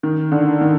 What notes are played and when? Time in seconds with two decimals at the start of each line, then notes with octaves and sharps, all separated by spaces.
0.03 D#3
0.32 D3
0.61 D#3